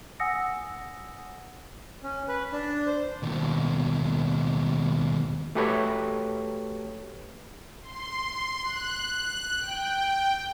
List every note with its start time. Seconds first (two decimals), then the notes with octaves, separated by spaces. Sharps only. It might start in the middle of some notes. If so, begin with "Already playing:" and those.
0.20 F#5 G#5 D#6 E6 A#6 C#7
2.03 C#4
2.28 B4
2.52 D4
2.87 C5
3.23 D#2 B2
5.55 A3 F#4 G4 A4 B4 C#5
7.82 C6
8.63 F#6
9.59 G5